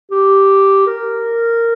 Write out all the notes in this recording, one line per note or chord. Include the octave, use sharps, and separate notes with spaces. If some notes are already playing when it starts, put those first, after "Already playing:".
G4
A#4